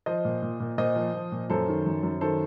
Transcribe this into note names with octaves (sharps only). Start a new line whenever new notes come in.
F3 C5 D#5
A#2
A#2
A#2
A#2 C5 D#5
F3
F3
A#2
F#2 A4 C5
D#3
F#2
F#2
D#3 A4 C5